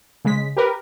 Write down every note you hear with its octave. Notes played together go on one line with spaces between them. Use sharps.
C#3 G#3 B6
G4 A#4 B4